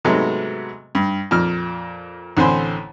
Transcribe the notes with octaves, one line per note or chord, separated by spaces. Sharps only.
G#2 C3 F#3 G#3 A3 B3
G2
F2 A#2 F6
A1 D3 C4 C5 G#5 B5